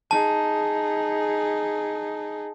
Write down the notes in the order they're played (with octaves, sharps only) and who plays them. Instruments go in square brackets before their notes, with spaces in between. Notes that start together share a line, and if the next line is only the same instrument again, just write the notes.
[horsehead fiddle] D#4 G#4 [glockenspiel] A5